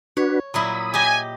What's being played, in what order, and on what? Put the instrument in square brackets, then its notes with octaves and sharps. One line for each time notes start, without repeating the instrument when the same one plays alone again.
[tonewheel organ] D4 F#4 B4 [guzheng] C#5
[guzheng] A#2 F#3 E4 [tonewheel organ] B5 D#6
[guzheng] G4 D#5 [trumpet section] G#5